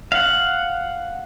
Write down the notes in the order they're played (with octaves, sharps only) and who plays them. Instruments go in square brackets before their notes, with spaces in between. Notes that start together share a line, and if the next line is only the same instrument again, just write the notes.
[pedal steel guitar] F5 F#5